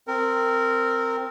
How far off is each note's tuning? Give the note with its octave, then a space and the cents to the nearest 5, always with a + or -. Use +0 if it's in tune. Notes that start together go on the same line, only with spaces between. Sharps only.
C4 +0 A#4 -20